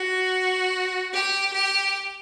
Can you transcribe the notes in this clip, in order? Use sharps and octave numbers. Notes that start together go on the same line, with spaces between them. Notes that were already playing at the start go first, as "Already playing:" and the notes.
Already playing: F#4
G4
G4